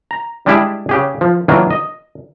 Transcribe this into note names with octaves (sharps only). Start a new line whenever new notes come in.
A#5
G3 G#3 D4 E4 G4 G#4
C#3 G4 G#4
F3
D#3 E3 F#3 A#3 D4 F4
D#5